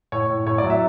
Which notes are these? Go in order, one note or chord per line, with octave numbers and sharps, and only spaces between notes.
A2 C#5
A2
A2 C#5
D5
F#3
E5